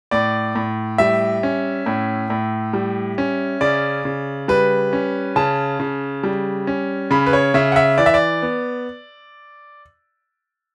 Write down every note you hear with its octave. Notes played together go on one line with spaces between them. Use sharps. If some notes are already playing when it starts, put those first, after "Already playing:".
A2 D5
A2
G3 E5
C#4
A2
A2
G3
C#4
C#3 D5
C#3
G3 B4
C#4
C#3 A5
C#3
G3
C#4
C#3 B5
B4
C#5
C#3 E5
F#5
E5
E3 D5
E5
D5
B3